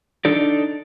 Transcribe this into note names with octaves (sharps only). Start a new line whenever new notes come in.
D4 D#4 A4 D5